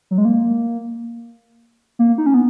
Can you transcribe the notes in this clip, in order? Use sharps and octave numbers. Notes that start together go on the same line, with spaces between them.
F#3
G#3
A#3
A#3
D#4
C#4
B3